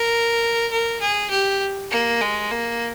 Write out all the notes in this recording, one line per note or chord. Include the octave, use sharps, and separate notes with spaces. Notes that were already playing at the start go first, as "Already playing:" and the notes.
Already playing: A#4
A#4
G#4
G4
A#3
G#3
A#3